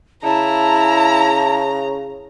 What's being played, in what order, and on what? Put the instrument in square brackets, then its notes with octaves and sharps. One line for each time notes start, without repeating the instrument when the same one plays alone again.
[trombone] C#3 [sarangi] E4 [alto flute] A5 [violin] A#5